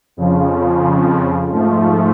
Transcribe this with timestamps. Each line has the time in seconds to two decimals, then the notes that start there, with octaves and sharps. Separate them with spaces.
0.17 F2 C#3 F3
1.51 G#2 F3 A3